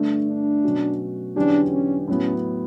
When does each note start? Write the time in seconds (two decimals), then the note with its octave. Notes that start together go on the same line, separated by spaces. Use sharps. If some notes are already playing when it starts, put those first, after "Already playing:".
Already playing: G2 D3 A3 D4
0.28 D4
0.64 B2 F#3 C#4 F#4
1.36 E2 D3 F#3 C#4 D4 G4
1.73 C#4
2.08 A2 F#3 B3 C#4